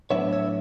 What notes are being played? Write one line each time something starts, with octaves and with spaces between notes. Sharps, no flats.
A2 F#3 B3 D4 C#5 E5
C#5 E5